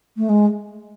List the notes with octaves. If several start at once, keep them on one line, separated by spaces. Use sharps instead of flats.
A3
G#3